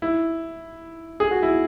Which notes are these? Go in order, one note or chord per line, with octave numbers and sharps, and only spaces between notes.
E4
G#4
F#4
E4